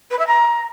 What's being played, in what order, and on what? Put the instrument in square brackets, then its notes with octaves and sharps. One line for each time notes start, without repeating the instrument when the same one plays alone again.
[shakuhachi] B4
E5
A#5